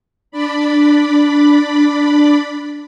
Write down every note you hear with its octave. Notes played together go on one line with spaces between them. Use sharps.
D4 D5 B5